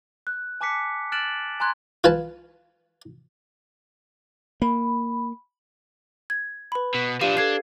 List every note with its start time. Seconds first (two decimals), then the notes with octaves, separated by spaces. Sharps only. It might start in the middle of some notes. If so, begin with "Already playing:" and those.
0.27 F#6
0.61 G#5 A5 D6 F#6 B6 C#7
1.12 F6 F#6 A6 D7 E7 F#7
1.60 G#5 A#5 C6 F#6 G#6
2.04 F4 B4 G#5 A5
4.62 A#3 B5
6.30 G#6
6.72 B4 B5
6.95 B2
7.21 F3 D4 G4 F5 D#7
7.37 D4 A4 G#6 C7